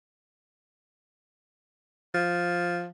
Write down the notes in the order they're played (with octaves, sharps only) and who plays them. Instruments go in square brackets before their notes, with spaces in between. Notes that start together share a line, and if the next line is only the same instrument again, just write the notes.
[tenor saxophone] F3